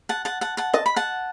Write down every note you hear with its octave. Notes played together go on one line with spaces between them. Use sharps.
F#5 A5
F#5 A5
F#5 A5
F#5 A5
D#5 A5
B5
F#5 A5